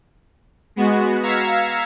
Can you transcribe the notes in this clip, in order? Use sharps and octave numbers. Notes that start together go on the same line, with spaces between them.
G#3 B3 F#4
F5 A#5 E6 G#6 B6 C#7